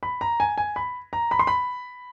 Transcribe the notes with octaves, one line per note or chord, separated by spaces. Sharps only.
B5
A#5
G#5
G#5
B5
A#5
B5
C6
B5